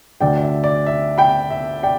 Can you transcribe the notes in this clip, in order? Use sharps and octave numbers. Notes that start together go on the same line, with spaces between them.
D2 D3 A3 D5 G5
D5
E5
D5
E5
G5 B5
E5
D5 G5